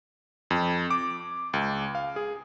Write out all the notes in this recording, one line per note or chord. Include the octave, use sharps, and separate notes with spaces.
F2
D6
C#2
F5
G#4